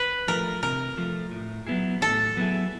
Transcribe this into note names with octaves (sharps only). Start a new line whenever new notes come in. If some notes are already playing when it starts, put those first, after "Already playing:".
Already playing: B4
F3 A3 A#4
C3 A#4
F3 A3
A2
F#3 B3 E4 G#4
A2 A4
F#3 B3 E4 G#4